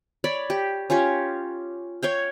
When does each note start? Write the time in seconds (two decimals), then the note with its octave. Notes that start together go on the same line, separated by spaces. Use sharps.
0.24 C#5 D5 B5
0.50 G4
0.90 C#4 F4 G4 C#5
2.03 C#5 F5 G5